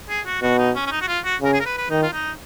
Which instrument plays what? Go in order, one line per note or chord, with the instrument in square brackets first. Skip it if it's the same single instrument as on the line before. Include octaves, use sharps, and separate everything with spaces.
[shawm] G#4
F#4
[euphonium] B2 [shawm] F#4
[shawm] D#4
C#4
C#4
D#4
F#4
F4
F#4
[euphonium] C#3 [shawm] A#4
[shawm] G#4
A#4
B4
B4
[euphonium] D#3 [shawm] D#4
[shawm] F4
D#4